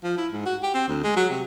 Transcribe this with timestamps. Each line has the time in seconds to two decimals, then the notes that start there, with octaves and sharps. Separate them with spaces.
0.04 F3
0.18 E4
0.32 G#2
0.46 F#4
0.63 G4
0.74 C4
0.88 D2
1.04 G#3
1.16 F#3
1.30 C3